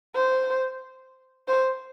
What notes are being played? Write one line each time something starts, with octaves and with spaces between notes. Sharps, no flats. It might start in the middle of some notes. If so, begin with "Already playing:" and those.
C5
C5